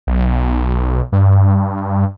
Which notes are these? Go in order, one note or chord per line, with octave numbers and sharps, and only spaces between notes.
B1
G2